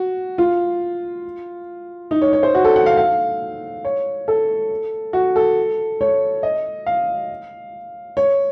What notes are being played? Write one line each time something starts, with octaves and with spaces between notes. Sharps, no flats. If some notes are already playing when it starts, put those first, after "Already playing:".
Already playing: F#4
F4
D#4
C#5
C#5
C5
F#4
A4
F#5
F5
F5
C#5
A4
F#4
A4
C#5
D#5
F5
C#5